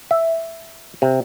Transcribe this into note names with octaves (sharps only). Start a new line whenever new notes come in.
E5
C3